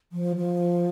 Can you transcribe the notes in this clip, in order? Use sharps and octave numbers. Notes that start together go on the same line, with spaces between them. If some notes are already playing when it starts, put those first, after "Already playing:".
F3
F3